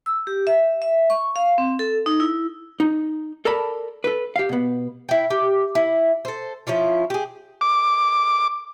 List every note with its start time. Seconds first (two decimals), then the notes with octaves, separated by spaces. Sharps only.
0.06 E6
0.27 G4
0.47 E5
0.82 E5
1.10 C#6
1.36 F5
1.58 C4
1.79 A4
2.06 D#4
2.20 E4
2.80 D#4
3.45 A4 A#4 D5 A5 B5
4.04 A4 B4
4.36 G4 F5
4.49 B2 B3
5.09 E4 G5
5.30 G4
5.75 E4
6.25 A4 C5
6.67 F3 C#4 E4 F4
7.10 G4 G#4
7.61 D6